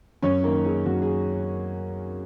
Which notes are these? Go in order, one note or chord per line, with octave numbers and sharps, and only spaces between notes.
F#2 C#4 C#5
D#3 A#3 A#4
D#3 G#4
F#2 F#4
G#4